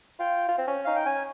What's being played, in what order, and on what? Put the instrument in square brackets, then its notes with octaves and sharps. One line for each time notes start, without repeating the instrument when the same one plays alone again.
[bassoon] F4 [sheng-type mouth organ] G5
[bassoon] F4
C4
C#4
[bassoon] D#4 [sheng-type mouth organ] F5
[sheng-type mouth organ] G5
[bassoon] C#4 [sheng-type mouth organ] G#5